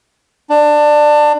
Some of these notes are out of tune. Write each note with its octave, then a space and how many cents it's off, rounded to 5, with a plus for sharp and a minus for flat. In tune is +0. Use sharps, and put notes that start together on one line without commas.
D4 +20